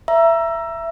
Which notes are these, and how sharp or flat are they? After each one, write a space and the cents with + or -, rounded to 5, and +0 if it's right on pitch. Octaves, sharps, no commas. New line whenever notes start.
E5 +15 A#5 +15